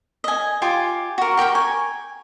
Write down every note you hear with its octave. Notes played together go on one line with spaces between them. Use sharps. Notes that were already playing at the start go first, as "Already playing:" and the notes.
D#5 G#5
F4 G4 G#5
F#4 A#4
G4 A#4 G5 C#6
G#5